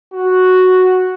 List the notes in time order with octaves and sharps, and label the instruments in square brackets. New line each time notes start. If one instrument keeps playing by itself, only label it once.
[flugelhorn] F#4